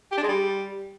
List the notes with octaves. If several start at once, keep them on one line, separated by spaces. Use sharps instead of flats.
G4
D4
G#3
G3